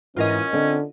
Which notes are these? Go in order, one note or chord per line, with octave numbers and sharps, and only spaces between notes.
G#2 E3 C#4 F4 A#4 D#5
D3 C4